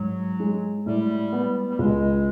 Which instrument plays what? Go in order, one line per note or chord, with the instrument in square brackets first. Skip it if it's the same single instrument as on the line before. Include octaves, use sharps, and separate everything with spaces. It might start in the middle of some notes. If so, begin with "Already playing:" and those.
Already playing: [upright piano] G#2 [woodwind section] F#3
[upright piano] G#3
[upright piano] A2 [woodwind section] G3
[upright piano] B3
[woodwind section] G3
[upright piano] C#2 [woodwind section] G#3